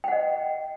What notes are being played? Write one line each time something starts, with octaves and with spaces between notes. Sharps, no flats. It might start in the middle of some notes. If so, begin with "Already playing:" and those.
D#5 F#5 G5